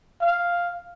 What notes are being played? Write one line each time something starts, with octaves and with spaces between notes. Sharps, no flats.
F5